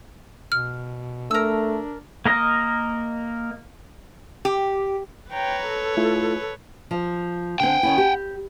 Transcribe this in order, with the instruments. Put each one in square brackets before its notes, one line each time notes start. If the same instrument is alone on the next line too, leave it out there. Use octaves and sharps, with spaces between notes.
[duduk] B2 [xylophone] F6
[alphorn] A3 [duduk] D4 [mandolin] A#4 E6
[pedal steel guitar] A#3 A#4 D#5
[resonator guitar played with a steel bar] G4
[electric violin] B4 C#5 [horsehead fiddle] G5 A#5
[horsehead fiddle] A4
[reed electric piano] A3 E4 F4
[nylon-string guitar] F3
[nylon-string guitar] D3 C4 [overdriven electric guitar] F#5 G5
[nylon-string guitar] D#3 C#4 E4
G4